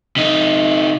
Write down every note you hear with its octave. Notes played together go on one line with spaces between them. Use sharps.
C3 D#4